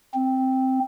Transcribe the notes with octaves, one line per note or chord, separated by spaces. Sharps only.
C4